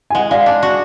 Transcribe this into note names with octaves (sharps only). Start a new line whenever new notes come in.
G#5
G#3 D#5 F#5
G#3 D5 F5
D4
F#4